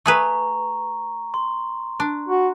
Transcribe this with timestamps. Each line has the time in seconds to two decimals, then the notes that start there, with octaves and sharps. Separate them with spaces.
0.06 A3 G#4 B4 A#5 C#6
1.34 C6
2.00 D4
2.29 F#4